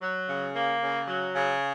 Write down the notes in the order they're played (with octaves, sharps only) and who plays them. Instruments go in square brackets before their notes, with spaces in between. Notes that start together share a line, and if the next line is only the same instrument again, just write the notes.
[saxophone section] F#3
C#3
A#3
C#3
F#3
C#3